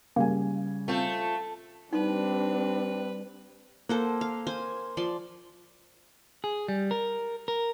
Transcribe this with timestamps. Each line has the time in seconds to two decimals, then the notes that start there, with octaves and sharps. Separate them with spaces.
0.16 C#3 G3 A#3 G#5
0.88 A3 C4 F4 A4
1.93 G3 C4 D4 D#4 B4
3.89 A#3 A4 C5 F#5
4.21 F5
4.47 C5 G#5
4.97 F3 D5 C6
6.44 G#4
6.68 G3
6.91 A#4
7.48 A#4